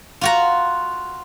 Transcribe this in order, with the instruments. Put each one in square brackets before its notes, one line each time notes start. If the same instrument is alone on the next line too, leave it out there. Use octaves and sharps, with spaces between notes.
[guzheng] F4 F#4 A#5